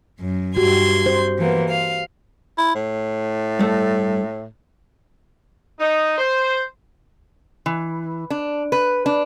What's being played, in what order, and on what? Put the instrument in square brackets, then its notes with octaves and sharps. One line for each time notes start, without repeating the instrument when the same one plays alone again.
[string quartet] F#2
[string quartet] G2 C6 G#6 [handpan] F#4 G4
[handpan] C5
[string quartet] E3 A#3 B3
F5
[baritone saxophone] E4
A2
[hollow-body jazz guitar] G2 A3
[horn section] D#4
C5
[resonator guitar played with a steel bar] E3
D4
B4
D4